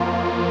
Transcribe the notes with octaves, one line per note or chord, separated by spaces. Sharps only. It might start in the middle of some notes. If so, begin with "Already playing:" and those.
Already playing: F2 F3 A#3 F4